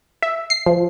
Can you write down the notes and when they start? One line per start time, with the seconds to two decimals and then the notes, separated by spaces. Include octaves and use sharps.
0.22 E5
0.50 C7
0.66 F3